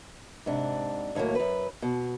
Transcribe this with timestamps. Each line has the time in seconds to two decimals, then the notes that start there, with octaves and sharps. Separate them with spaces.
0.46 G#2 C3 D4
1.15 D#2 A2 D3 F#3 A#3
1.35 F#2 B4
1.82 B2